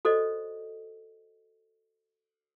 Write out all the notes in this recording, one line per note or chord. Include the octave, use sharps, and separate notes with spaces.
F#4 A4 C5 D5 D#5